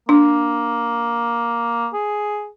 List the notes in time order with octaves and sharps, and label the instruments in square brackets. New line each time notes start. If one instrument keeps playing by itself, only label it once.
[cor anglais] A#3 [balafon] D4
[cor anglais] G#4